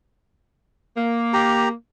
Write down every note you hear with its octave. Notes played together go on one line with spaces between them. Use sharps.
A#3
G4 A#5